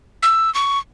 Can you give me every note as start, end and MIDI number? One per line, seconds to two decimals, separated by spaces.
0.23 0.52 88
0.54 0.79 85